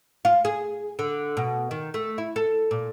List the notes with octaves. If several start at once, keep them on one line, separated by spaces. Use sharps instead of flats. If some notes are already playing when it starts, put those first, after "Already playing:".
F4
G#4
D3
B2
D#3
A3
E4
A4
A#2